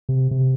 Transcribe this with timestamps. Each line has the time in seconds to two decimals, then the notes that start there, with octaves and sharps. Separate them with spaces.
0.09 C3
0.31 C3